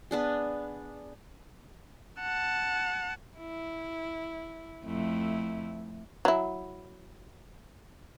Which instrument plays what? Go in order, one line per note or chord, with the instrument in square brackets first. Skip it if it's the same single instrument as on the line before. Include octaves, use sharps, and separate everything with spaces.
[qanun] B3 D4 G#4
[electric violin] F#5 A5
[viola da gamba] E4
F2 A3 E4
[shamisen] F#3 E4